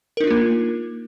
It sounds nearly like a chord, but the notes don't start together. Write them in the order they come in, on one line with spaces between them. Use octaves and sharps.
A#4 D#4 D4 F4 A#3